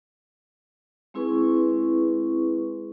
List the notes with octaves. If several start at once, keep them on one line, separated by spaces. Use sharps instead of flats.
G#3 C4 E4 G#4 B4 C#6